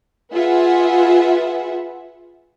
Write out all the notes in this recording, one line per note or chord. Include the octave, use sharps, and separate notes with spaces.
F4 G#4 B4 E5 F#5